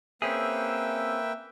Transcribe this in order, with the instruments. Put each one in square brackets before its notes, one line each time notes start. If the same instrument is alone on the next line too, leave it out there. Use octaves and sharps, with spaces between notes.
[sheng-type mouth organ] A#3 B4 G5 [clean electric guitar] C4 C#4 G#4 [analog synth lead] E5